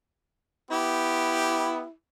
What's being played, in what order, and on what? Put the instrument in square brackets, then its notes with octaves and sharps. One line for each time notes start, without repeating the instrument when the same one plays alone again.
[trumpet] B3 [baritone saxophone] E4 [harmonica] G4